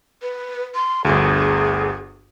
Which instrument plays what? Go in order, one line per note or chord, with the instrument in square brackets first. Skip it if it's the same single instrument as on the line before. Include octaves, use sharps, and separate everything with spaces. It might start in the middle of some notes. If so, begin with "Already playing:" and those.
[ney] B4
C6
[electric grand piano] G1 D2 [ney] G#4